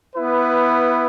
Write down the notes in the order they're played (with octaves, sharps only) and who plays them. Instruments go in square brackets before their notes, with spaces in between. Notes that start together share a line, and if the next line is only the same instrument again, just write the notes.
[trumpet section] B3 E4 B4